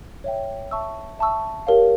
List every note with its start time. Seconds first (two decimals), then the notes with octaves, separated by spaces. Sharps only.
0.24 C#5 E5 G5
0.71 E5 A5 C#6 E6
1.19 E5 A5 C#6 E6
1.67 G4 A#4 C#5 F5